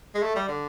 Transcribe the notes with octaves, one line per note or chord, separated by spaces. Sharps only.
G#3
A3
G3
D3